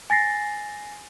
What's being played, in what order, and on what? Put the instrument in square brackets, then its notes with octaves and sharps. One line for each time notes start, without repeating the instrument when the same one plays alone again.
[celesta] G#5 A6 A#6 C7